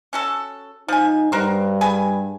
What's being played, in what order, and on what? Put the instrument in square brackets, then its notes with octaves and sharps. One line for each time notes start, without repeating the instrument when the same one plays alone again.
[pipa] C#4 F#4 A4
[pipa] F3 G#5 [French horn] D#4
[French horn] G2 [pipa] F#4 A#4 C5
[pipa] G#4 B4 G#5